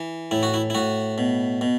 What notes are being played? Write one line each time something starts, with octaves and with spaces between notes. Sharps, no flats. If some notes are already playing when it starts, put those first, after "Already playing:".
Already playing: E3
A2 E4
F#4
E4
E4
A2 F#4
B2
B2